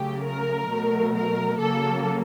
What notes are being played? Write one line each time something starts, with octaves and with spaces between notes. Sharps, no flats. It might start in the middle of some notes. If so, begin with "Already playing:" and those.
Already playing: C#3 F#3 A3 G4
A#4
B2 F#3 A3
A#4
C#3 F#3 A#3 A4